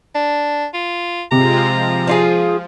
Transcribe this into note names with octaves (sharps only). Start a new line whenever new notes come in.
D4
F4
C3 G#3 C4 F4 A#5
F3
D4 F4 G#4